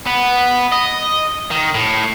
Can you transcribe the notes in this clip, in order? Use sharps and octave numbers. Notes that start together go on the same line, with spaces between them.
B3
D#5
D#3
A2